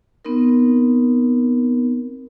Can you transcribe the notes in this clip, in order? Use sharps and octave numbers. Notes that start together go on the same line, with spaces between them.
B3 C4 D#4 A#4